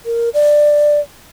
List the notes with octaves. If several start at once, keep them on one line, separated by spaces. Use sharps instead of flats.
A#4
D5